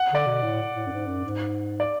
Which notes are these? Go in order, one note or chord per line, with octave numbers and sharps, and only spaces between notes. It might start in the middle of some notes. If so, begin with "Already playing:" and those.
Already playing: F#5
D3 D5
B2
A2
A2
F#2
G#2
F#2
G#2
D5